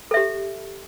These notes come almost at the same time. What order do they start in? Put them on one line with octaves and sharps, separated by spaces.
A4 E5 G4